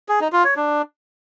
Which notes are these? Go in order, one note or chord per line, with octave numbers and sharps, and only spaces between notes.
G#4
D#4
F4
C#5
D4